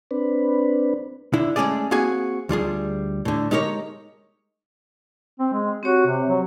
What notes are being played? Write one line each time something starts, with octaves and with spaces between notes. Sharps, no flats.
C4 D4 B4
D3 E4
G#3 A3 C#4 G#4 D5
A#3 C4 F#4 G#4 G#5
D2 G3 F4 G#4
A2 D3
G#3 D#4 G4 A#4 C#5
C4
G#3
C4 F#4 G4 C#5
C3
F#3